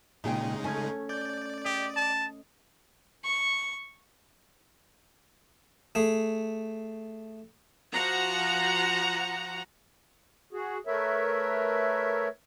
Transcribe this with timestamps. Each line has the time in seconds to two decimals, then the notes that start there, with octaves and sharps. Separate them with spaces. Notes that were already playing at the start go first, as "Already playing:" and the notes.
0.24 A#2 C#3 G#3 D#4 G#4 G5
0.64 A3 C#4 G#5 G#6
1.09 D5 G6
1.65 G4 D#5
1.96 A5
3.24 C#6
5.95 A3 G#4
7.93 F3 F#4 F#5 A#5
10.53 F#4 G#4
10.87 A3 A#4 B4 C#5 E5